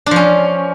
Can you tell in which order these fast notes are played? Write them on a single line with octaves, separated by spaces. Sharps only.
D4 F3 C#4